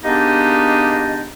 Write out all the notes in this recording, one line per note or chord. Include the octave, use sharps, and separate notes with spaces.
G#3 A#3 B3 D4 D#4 G4